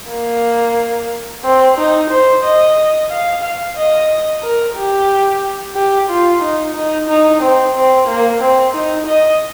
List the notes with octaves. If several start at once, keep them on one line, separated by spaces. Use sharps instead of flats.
A#3
C4
D#4
C5
D#5
F5
F5
D#5
A#4
G4
G4
F4
D#4
D#4
D#4
C4
C4
A#3
C4
D#4
D#5